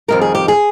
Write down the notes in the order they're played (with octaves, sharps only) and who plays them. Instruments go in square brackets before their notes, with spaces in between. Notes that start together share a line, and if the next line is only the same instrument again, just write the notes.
[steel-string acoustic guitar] F2 D#3 G3 A#4
G#4
G4
G#4